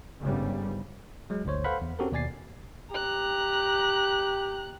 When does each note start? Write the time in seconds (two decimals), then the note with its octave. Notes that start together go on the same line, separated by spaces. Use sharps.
0.19 G1 G#2 C#3 G3
1.30 F#3 G#3
1.45 G1 D2 D3 C5 C#5
1.64 A4 B4 C5 F5 F#5 B5
1.81 E2
1.99 C4 C#4 F#4 G4 A4 A#4
2.12 D#2 B2 D5 G#5 A6 C7
2.92 G4 A#5 F#6